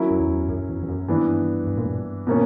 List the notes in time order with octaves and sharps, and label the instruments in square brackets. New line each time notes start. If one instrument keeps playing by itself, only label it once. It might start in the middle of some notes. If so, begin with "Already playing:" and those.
Already playing: [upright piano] F#3 C#4 E4 A#4
[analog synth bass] F#2
E2
F#2
E2
E2
F#2
[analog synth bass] G2 [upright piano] E3 B3 D4
[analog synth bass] G2
A#2
G2
[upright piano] B2 A#3 C#4